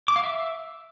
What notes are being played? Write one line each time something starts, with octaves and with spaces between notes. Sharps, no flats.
D6
F5
E5